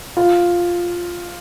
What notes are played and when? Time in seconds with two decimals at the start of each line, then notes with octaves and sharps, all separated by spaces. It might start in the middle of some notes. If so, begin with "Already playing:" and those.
0.17 F4